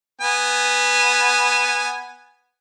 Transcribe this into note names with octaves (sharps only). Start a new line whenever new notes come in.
B3 G#5